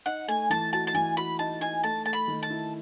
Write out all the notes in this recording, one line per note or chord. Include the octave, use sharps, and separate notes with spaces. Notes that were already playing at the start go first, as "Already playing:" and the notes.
D#4 F#5
A3 G#5
E3 A5
F#4 A5
A5
E3 G#5
F#4 B5
D#4 A5
D#4 G#5
A3 A5
A3 A5
B5
D#3
A5
E4